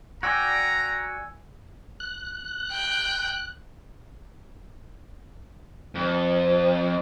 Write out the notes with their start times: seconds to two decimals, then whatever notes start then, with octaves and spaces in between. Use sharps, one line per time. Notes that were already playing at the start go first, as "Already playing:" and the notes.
0.23 F#4 D5 G5 G#5 A#5 E6 G#6
2.00 F#6
2.71 G5
5.95 F2